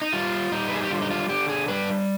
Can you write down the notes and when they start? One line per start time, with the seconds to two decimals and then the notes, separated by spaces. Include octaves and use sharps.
0.02 D#4
0.12 G3 F4
0.52 G3 D#4
0.68 B4
0.75 G#4
0.83 G4
0.91 D3 F4
1.02 D#4
1.10 F4
1.29 D3 G4
1.49 G#4
1.68 G3 B4